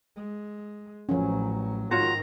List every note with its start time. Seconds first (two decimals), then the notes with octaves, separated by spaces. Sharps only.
0.16 G#3
1.09 A1 F3 F#3 C#4
1.91 G#2 D#3 F4 F#4 C#5 A#5